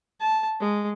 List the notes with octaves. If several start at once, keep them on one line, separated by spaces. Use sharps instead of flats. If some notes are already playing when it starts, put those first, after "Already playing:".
A5
G#3